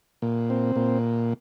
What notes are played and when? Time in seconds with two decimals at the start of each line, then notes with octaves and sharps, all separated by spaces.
0.22 A#2
0.50 C4
0.76 A#2